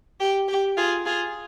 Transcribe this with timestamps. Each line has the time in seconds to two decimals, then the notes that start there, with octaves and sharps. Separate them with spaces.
0.20 G4
0.48 G4
0.77 F4 G#4
1.06 F4 G#4